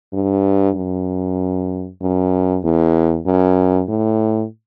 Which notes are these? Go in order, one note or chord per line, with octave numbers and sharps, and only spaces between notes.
G2
F#2
F#2
E2
F#2
A2